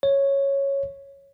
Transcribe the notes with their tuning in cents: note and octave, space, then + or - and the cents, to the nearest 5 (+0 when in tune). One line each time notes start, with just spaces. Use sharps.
C#5 -5